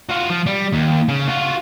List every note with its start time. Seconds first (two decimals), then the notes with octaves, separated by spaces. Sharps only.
0.09 F4 F#4
0.30 F3
0.46 G3
0.72 D#2
1.08 C#3
1.28 F4 F#4